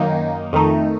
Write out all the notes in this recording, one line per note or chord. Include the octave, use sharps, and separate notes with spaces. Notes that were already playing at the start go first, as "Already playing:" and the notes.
Already playing: F#2 D#3 A#3 D#4
F2 D#3 A3 D#4